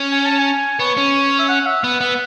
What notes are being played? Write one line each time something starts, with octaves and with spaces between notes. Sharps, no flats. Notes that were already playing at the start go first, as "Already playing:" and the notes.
Already playing: C#4
G#5
A5
G#5
B3 C#5
C#4
E5
F#5
E5
B3 F#5
B3